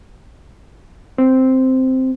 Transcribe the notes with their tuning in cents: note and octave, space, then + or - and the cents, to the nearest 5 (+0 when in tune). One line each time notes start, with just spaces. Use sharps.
C4 -5